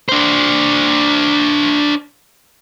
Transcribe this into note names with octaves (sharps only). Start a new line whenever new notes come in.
D4 C5